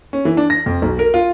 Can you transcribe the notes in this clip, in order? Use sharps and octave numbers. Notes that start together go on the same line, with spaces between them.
C#4
E3
D4
A#6
F2
B1
A#4
F4